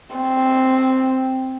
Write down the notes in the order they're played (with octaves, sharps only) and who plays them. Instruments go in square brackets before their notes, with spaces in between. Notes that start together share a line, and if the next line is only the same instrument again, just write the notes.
[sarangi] C4